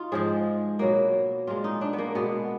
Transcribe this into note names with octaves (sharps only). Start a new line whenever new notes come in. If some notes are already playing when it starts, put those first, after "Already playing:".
Already playing: D#4 F4
G#2 F3 G#3 G#4
B2 F#3 A#3
A#2 G#3 F4
D#4
D4
B3
A#3
B2 G#3 B3